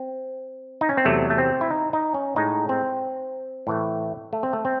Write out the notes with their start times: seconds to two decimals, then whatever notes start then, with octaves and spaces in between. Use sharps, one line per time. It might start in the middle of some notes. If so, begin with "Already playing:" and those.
Already playing: C4
0.81 D#4
0.89 C#4
0.97 C4
1.05 E2 C3 F#3 A3
1.30 A3
1.38 C4
1.61 E4
1.70 D#4
1.93 D#4
2.14 C#4
2.36 A2 G#3 D#4
2.69 C4
3.67 A2 E3 A3
4.33 A3
4.43 C4
4.53 A3
4.65 C4